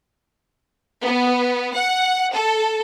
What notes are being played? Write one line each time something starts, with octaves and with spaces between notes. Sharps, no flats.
B3
F#5
A4